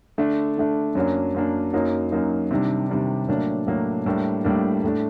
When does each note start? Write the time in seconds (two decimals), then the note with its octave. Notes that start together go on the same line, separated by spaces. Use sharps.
0.18 D3 A3 D4
0.57 D3 A3 D4
0.95 F#2 F#3 A#3 D4
1.35 F#2 F#3 A#3 D4
1.73 F#2 F#3 A#3 D#4
2.11 F#2 F#3 A#3 D#4
2.51 C3 D#3 G3 D4
2.89 C3 D#3 G3 D4
3.28 A2 F#3 A#3 D4
3.67 A2 F#3 A#3 D4
4.06 A2 G3 A#3 D4
4.44 A2 G3 A#3 D4
4.83 A2 A3 D4